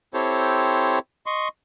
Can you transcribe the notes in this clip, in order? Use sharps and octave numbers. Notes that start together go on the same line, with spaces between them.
C4 E4 G4 A4 C5 C#5
D#5 C6 C#6